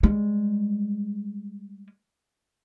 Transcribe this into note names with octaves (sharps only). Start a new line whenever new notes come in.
G3 G#3